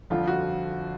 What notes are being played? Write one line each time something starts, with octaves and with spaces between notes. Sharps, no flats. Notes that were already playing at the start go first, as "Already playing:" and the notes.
G1 F2 D3 F3 F4
F#4